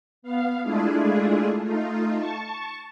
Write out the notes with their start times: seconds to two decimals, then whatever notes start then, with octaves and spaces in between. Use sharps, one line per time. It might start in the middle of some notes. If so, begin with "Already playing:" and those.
0.22 B3 F5
0.63 G#3 A3 D4 E4 F4 G#4
1.61 A3 D#4 F4
2.17 A5 C#6